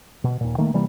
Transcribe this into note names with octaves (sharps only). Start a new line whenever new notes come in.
B2
D#2 A#2
D#3 A3 A#3
C3 E3 G3 A#3